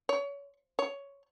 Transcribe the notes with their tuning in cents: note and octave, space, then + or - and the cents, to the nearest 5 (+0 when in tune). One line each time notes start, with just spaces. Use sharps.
C#5 +30
C#5 +10